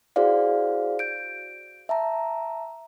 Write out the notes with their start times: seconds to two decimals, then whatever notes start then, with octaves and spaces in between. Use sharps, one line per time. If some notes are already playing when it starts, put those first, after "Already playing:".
0.16 E4 F#4 G#4 C5 D5 F5
0.99 G6 D7
1.89 E5 A5 A#5